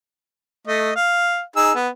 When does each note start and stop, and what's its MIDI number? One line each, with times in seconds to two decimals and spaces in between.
0.67 0.91 57
0.67 0.91 75
0.96 1.41 77
1.56 1.73 63
1.56 1.73 68
1.56 1.73 88
1.75 1.89 59